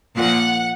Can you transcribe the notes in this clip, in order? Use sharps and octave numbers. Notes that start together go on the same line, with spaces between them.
A#2 F3 A#3 F#5